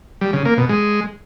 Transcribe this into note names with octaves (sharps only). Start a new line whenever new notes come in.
G3
C#3
A#3
B2
G#3